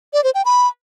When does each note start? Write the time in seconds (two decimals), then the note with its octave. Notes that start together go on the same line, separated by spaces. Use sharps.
0.13 D5
0.24 C5
0.35 G5
0.45 B5